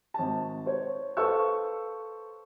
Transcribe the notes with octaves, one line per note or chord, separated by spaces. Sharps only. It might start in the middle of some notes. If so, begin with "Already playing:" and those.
G#1 A5
C5 C#5
A4 B4 C5 F5 C#6 E6